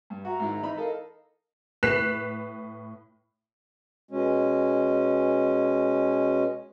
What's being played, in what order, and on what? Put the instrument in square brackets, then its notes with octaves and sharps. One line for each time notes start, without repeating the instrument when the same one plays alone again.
[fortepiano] G2
[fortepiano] F#4 [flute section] E5 A#5
[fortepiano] G#2 D#3 E4
E3 D#4 B5
[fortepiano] A4 D#5 [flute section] A#4 F5
[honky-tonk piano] A2 B4 F#6 B6 C7 E7
[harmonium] B2 G#3 C#4